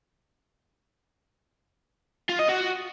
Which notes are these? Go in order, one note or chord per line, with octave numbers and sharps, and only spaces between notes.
F4
D#5
F#4